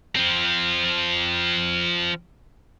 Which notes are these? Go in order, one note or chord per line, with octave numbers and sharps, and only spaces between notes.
F3 C4